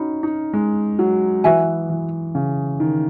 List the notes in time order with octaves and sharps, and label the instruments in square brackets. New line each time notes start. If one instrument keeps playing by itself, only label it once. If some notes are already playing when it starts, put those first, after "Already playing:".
Already playing: [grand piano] C#4 D#4 [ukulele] F#4 B5
[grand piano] D#4
G#3
F#3
[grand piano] E3 [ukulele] F#4 B4 E5 G#5
[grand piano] E3
C#3
D#3